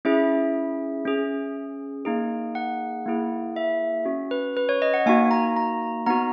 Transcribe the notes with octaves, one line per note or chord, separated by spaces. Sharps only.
C#4 E4 G#4 E5
C#4 G#4
A#3 D#4 G#4
F#5
A#3 E4 G#4
E5
C#4 F#4
B4
B4
C#5
D#5
F#5
A#3 D#4 F#4 G#5
A#5
A#5
B3 D#4 F#4 A#5